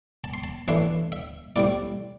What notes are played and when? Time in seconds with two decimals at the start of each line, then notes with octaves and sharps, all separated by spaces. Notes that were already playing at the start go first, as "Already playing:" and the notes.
0.24 A5
0.34 C6
0.44 A5
0.68 A2 E3 A3 D4 C6
1.12 E5
1.56 A2 G3 C4 D5